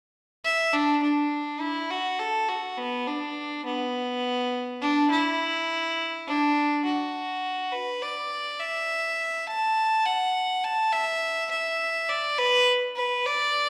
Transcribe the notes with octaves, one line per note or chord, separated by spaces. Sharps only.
E5
D4
D4
E4
F#4
A4
F#4
B3
D4
B3
D4
E4
D4
F#4
B4
D5
E5
A5
F#5
A5
E5
E5
D5
B4
B4
D5